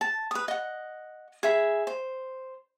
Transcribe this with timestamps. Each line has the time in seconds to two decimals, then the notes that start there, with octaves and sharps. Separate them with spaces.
0.01 A5
0.31 B4 D#6
0.48 D#5 F#5
1.43 G#4 E5 B5
1.87 C5